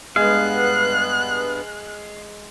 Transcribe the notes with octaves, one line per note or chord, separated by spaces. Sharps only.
G2 G#3 B3 F5 F#6